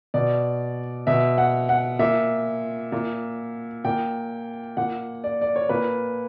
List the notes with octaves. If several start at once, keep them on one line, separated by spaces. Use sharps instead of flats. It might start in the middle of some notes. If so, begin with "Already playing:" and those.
B2 D5
B2 E5
F#5
F#5
A#2 E5
A#2
A#2 G5
A#2 F#5
D5
D5
C#5
A#2 B4